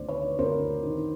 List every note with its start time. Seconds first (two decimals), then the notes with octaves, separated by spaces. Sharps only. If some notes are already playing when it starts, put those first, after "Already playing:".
Already playing: D2 D#3 C5 D5
0.08 B4 C#5
0.39 D2 A#4 C5
0.83 D#3